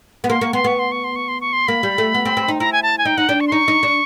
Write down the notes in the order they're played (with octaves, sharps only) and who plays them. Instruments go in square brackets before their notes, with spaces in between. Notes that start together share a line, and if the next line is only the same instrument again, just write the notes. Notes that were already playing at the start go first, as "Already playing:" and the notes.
[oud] B3
[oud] A#3 [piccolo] C6
[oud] A#3 [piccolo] C#6
[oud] B3 [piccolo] C6
[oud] B3 [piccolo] C#6
[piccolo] C6
C#6
C6
C#6
C6
C#6
C6
[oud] A#3 [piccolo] B5
[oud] G3
A3
B3
C4
C4
D#4
[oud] E4 [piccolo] A#5
[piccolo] G#5
A5
G#5
[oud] D#4 [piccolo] G5
[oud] D#4 [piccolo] F#5
[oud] D4 [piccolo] G5
[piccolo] C#6
C6
[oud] D#4 [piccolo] C#6
[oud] D#4
D4